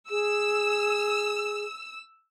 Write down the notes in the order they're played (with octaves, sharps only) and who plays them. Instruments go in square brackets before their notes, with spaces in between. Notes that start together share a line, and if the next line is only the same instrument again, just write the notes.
[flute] G#4 [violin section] E6